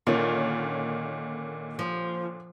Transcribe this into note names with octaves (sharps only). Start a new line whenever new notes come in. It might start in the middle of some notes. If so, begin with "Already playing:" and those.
A#2 D3 D#3 C#4
F3